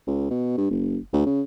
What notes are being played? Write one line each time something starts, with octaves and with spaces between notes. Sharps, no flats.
C#2
B2
G2
F#1
D2
C#3